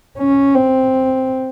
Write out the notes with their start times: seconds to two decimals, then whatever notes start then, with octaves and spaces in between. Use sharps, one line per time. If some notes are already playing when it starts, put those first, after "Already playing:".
0.18 C#4
0.55 C4